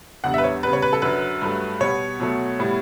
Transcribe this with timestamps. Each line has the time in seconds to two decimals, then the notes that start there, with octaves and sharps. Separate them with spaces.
0.24 E2 D3 G3 F#5
0.34 B4 E5
0.44 C#5
0.63 C#3 G3 B3 B4
0.73 C#5
0.82 B4
0.93 A4
1.02 F#2 D3 F#3 B4
1.42 G2 F#3 A3
1.81 B2 G3 B3 C#5
2.20 B2 F#3 A3
2.59 A2 G3 B3